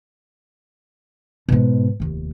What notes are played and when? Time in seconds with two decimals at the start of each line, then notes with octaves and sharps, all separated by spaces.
1.49 G#2 B2
2.00 F1 D#2